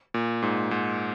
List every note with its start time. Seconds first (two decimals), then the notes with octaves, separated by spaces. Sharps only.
0.14 A#2
0.42 G#2
0.71 G#2